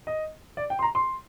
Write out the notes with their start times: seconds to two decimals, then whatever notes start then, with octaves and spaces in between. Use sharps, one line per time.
0.07 D#5
0.57 D5
0.70 G5
0.79 C6
0.82 A#5
0.95 C6